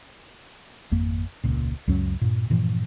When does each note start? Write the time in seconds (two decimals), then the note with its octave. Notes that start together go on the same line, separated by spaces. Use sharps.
0.91 G#1 F2 A#3
1.44 E1 C#2 A#2
1.88 C#2 F#2 F#3 C#4
2.21 G2 A#2
2.50 G2 A#2 E3 F3